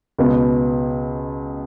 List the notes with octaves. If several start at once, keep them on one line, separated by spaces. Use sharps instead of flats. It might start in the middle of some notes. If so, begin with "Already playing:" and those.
C#2 B2 B3